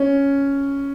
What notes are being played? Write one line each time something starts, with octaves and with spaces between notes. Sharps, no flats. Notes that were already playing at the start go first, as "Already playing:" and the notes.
Already playing: C#4